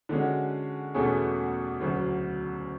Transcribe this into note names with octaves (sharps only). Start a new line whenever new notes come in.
D3 G#3 C#4 F#4
E2 B2 A3 C#4 G#4
D2 C#3 F#3